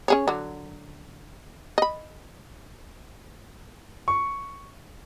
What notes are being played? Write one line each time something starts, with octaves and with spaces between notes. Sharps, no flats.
C#4 G#4 C#5
D3 F#3
D#5 B5
C#6